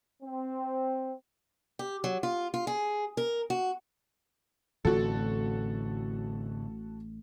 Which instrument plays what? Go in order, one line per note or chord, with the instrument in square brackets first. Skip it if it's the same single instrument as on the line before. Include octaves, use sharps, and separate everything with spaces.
[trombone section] C4
[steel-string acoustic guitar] G4
F#3
F4
F4
G#4
A#4
F#4
[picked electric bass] A1 [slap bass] A2 D3 C4 [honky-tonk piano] F#4 A4